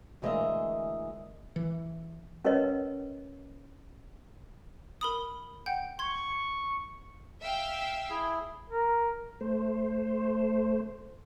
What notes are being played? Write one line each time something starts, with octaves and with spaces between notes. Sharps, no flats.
D2 E3 G#3 A#3 D#5 E5
E3
C#4 A#4 B4 C#5 D#5
A#4 B5 D#6
F#5 G5 G6
C6 C#6 G#6
E5 F5 G5
E4 G#4
A#4
A3 C5